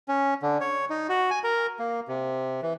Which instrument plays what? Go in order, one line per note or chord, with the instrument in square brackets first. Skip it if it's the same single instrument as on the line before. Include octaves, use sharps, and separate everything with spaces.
[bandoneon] C#4
D3
C#5
D#4
F#4
G#5
A#4
A#3
C3
E3